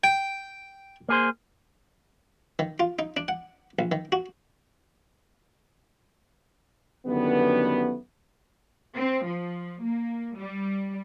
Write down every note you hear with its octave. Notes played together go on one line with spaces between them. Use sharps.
G5
A#3 G#4 C5
D#3
F4
D#4
D4
F#5
A#1
D#3
F#4
F#2 D3 D#3 G3 A3 B3
C4
F3
A#3
G3